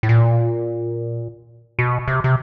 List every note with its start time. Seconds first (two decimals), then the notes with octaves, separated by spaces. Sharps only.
0.03 A2
0.09 A#2
1.79 B2
2.08 C3
2.24 C3